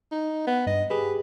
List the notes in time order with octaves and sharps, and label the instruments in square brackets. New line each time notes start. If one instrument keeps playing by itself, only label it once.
[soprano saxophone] D#4
B3
[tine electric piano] G2 [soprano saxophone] D#5
[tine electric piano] G4 G#4 [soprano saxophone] B4